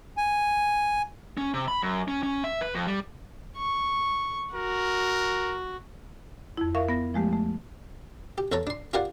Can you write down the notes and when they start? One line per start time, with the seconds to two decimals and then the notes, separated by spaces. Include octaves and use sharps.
0.17 G#5
1.37 C#4
1.54 C3
1.68 B5
1.82 F#2
2.08 C#4
2.23 C#4
2.44 E5
2.61 B4
2.75 F2
2.87 G3
3.57 C#6
4.54 F#4 A#4
6.57 F2 E4
6.75 A#4 E5 F5 C#6
6.89 B3 A#6
7.14 F3 G#3 A3 G4
7.33 A3
8.38 G4
8.52 E2 A4 C#5 A5 A#5
8.67 D4 C6
8.93 F4 G4 A#4 D5 F5 F#5